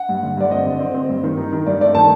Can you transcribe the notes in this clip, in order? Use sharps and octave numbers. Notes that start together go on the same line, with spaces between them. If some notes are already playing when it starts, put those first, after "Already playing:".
Already playing: F#5
G2
D3
G2 D5
C4 D#5
D3
C4
C4
G2
D#3
D#4
D#3
G2 D5
A3 D5
D#3 A5